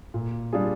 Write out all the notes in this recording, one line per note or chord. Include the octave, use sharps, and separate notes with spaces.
A#2
G3 D4 F4 G#4